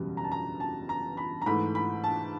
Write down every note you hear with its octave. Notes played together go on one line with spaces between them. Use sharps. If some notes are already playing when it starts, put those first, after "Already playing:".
Already playing: F#1 E2 B2 G3
A#5
A5
A#5
A5
A#5
B5
A#5
G#2 E3 A3 B5
B5
A5